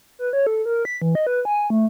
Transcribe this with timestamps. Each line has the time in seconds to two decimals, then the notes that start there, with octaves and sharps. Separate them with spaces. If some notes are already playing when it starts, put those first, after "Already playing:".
0.19 B4
0.33 C#5
0.47 A4
0.66 A#4
0.85 B6
1.02 E3
1.15 D#5
1.27 B4
1.45 G#5
1.70 A3